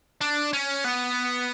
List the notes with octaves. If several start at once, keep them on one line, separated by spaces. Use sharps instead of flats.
D4
C#4
B3